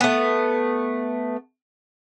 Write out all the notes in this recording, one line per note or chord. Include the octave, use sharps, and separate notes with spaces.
A3 B3